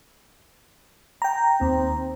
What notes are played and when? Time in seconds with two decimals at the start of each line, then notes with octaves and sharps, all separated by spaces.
1.22 G5 A#5
1.61 D#2 C4